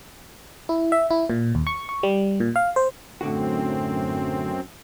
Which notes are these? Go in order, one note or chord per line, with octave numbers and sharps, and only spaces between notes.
E4
E5
E4
A#2
D#2
C#6
C#6
G3
A#2
F5
C5
F#2 A2 D3 C4 F#4